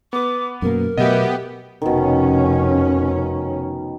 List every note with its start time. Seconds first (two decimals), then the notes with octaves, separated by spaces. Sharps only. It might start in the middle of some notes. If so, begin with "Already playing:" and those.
0.13 B3 B4 D6
0.62 F#2 B2 A#3 A#4
0.98 B2 F#3 A3 B3 G4 D#5 E5
1.82 F1 B2 D#3 C#4